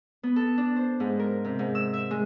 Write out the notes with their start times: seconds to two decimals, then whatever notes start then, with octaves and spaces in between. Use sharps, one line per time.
0.23 B3
0.36 A4
0.58 D4
0.76 C5
1.00 G#2
1.19 A#4
1.44 C3
1.59 G#2
1.75 E6
1.93 E5
2.11 G#3